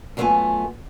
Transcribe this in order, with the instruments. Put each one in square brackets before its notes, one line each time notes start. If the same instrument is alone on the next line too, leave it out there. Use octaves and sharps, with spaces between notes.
[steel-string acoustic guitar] F#2 F#3 A3 B3 F4 G#5